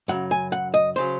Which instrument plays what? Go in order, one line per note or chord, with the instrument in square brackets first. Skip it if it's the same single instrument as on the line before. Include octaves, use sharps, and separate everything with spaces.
[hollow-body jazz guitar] F#2 C#3 F#3 F#5
G#5
F#5
D#5
C#3 F#3 C5